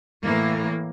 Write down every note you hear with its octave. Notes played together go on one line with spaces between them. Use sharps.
A2 E3 A#3